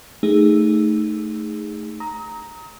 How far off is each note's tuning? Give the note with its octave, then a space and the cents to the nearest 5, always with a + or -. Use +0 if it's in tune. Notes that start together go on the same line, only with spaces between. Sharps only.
A3 +0 D#4 +0 G#4 -20
A#5 +0 D#6 +40